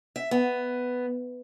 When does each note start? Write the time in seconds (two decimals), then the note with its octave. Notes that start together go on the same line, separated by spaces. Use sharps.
0.16 E5
0.31 B3